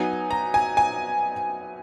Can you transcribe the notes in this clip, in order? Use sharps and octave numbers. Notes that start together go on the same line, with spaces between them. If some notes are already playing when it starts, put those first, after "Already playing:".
Already playing: F#3 B3 D#4 G#5
A#5
G#5
G#5